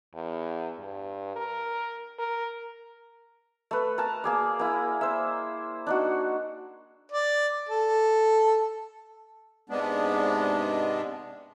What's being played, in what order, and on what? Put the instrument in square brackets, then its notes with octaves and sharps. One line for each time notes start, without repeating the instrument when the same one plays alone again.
[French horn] E2
G2
A#4
A#4
[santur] A3 B4
A#4 A5
A#3 G#4 D5
A#3 E4
C5 E5
D4 D#4 F#4
[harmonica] D5
A4
[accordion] G#2 C3 G#3 B3 D4